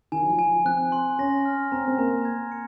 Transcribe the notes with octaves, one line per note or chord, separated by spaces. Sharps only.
D#3 G#5
F#3
F3
G#5
F3
C4 F#6
C6
C#4 A#6
F6
C4 A#5
C4
A#3 A#5
G#6
C#7